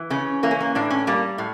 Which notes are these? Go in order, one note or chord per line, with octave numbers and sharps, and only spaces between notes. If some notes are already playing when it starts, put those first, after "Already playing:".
Already playing: E3
C#3 C#4
E3 A#3
C#4
A#3
A2 D4
C#4
G3 A#3
A2